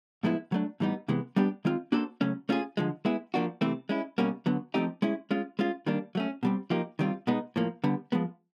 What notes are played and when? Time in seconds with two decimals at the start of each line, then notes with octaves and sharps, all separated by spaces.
0.23 A2 F3 G#3 B3 E4
0.52 F#3 A3 D4
0.80 A2 E3 G3 B3 D#4
1.08 C3 E3 G#3 B3
1.36 G3 B3 D4 G4
1.65 D#3 G#3 C4 F4
1.92 A#3 D4 F#4 A4 C5
2.21 C#3 F#3 A3 C#4
2.49 A3 C#4 F4 G#4
2.77 D3 F3 G#3
3.05 G#3 B3 E4 G#4
3.34 F3 A#3 D4 F#4
3.61 C3 E3 A3 C4
3.89 G#3 C#4 E4
4.18 B2 G3 A#3 C#4 F#4
4.46 D3 F#3 B3
4.74 F3 A3 C4 D#4 G4
5.02 G#3 C#4 E4
5.31 G#3 C#4 F4
5.59 G#3 C#4 F4
5.86 D#3 G3 A#3 D4
6.15 F#3 A3 C#4
6.43 B2 G3 C4
6.70 F3 A#3 D#4 G4
6.99 D#3 G3 C4 F4
7.27 B2 G#3 B3 D#4
7.56 A2 F3 A#3
7.84 D3 G3 B3
8.12 F3 G#3 B3